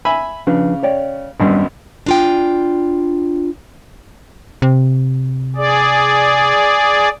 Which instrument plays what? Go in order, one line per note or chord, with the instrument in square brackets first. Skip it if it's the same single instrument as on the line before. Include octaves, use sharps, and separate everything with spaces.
[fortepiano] E5 G#5 B5
[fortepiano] C#3 [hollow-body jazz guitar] F3 D4 B4
[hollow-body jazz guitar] C#5 D5 G5
[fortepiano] G#1 F#2 B3 [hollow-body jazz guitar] G3 D4
[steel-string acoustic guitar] D4 F4 G5
[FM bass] C3
[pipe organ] G#4 D5